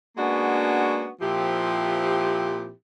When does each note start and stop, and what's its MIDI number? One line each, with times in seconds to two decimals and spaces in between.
0.17 1.10 56
0.17 1.10 58
0.17 1.10 59
0.17 1.10 61
0.17 1.10 62
0.17 1.10 66
1.21 2.71 46
1.21 2.71 53
1.21 2.71 60
1.21 2.71 64
1.21 2.71 67